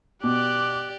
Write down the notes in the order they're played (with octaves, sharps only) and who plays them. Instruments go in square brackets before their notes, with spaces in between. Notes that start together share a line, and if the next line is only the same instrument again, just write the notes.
[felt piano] B2 [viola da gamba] G4 D5 [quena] D6 [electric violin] F#6